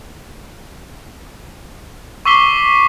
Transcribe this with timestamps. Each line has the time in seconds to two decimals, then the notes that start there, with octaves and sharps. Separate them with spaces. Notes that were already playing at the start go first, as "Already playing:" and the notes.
2.25 C#6 D6 E6 B6 C7 G7